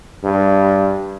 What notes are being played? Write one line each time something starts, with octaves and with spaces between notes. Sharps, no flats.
G2